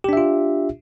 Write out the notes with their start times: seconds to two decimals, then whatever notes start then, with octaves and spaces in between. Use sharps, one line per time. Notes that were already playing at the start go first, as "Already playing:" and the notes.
0.04 G4
0.09 D4
0.13 E5
0.17 F4